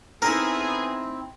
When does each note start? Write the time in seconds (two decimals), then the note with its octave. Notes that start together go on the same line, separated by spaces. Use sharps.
0.22 A2 B3 C4 D#4 E4 G#4 A#4